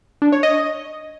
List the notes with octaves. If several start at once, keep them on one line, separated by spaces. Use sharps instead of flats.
D4
C#5
D#5